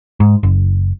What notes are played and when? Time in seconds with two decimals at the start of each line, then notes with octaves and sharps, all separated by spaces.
0.20 G#2
0.43 F#1